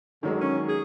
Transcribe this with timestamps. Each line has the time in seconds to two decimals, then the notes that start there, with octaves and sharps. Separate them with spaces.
0.23 D3 D#3 F#3 G#3
0.41 C#4
0.69 G#4